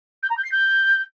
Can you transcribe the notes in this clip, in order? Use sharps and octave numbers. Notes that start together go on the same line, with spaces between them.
G6
A#5
G6
C7
G6